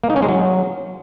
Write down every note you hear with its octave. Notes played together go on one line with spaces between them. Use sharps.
A#3
D#4
C#4
G#3
F#3